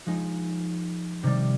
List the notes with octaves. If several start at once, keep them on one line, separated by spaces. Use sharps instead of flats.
F3 G#3 D#4
C3 D#3 G3